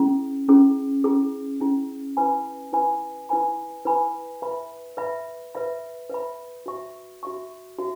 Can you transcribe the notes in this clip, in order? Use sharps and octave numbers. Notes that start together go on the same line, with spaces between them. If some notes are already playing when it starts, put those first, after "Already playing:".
Already playing: C#4 E4 G#4
C#4 E4 G#4
C#4 E4 G#4
C#4 E4 G#4
E4 B4 G#5 B5
E4 B4 G#5 B5
E4 B4 G#5 B5
E4 B4 G#5 B5
B4 E5 B5
B4 E5 B5
B4 E5 B5
B4 E5 B5
F#4 E5 C#6
F#4 E5 C#6
F#4 E5